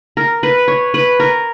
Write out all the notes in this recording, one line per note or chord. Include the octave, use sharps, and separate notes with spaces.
A#4
B4
C#5
B4
A#4